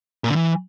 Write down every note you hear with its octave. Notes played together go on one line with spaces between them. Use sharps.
A#2
D3
E3